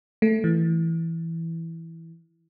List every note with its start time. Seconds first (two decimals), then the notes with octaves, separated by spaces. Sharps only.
0.22 A3
0.44 E3